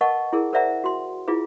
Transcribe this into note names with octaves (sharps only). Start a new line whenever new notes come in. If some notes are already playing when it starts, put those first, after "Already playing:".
A#4 B4 D#5 F#5 A5 C#6
E4 G#4 A#4
A#4 C5 D5 E5 F#5 A#5
F#4 C6
E4 F4 G#4 B4